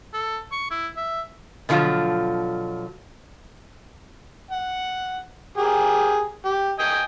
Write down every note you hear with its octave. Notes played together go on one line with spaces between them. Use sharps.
A4
C#6
E4
E5
B2 D3 F3 F#3 F4
F#5
G4 G#4 A#4
G4
D#5 G5 G#5